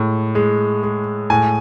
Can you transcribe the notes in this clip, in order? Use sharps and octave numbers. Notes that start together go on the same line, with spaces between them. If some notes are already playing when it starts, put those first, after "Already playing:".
Already playing: A2 G#3
G#3
G#3
A2 G#5